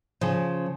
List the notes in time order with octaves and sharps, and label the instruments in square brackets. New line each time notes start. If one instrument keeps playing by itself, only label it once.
[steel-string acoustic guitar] C#3 F3